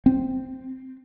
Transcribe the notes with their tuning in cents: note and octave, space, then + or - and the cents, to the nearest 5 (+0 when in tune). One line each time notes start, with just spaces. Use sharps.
C4 -5